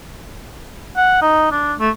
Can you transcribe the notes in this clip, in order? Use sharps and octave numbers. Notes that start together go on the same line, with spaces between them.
F#5
D#4
D4
A3